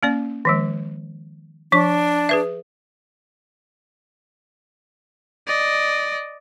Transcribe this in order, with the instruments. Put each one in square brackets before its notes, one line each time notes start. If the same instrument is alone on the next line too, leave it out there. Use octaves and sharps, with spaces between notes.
[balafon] A#3 C#4 D5
D#3 F3 G#3
[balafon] F3 C#6 [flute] D4
[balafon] G#4 B4 E5
[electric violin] D5 D#5